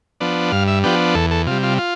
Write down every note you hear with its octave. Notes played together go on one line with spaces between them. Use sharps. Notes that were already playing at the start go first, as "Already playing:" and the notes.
F3 B3 D4
G2 F5
E5
F3 B3 D4 G4
E2 A4
A4
C3 G3 F4
F4
F4